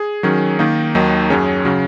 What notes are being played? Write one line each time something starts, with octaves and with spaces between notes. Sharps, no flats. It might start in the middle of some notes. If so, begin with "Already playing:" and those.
Already playing: G#4
D#3 F#3 C#4 G#4
D#3 A#3 D#4
D#2 D#3 F#3 D#4
F#2 F#3 C#4 G#4
C#3 F#3